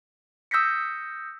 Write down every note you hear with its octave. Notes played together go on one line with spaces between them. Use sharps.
D#6 E6 G6 A#6 B6 C#7